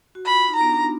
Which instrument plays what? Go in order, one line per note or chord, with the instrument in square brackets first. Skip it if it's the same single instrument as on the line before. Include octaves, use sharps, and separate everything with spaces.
[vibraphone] F#4
[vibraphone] F4 [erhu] B5
[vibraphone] D#4
[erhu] A#5
[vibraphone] B3
D4